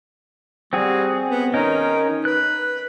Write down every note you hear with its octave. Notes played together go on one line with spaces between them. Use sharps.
G3 C4 F#4 G#4
B3
D#3 C#4 D#4 A#4
B4 F#6